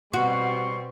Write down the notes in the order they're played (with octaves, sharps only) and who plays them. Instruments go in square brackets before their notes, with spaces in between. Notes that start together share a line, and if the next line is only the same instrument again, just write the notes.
[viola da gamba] B2 C4 [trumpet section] G3 C6 C#6 [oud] F#4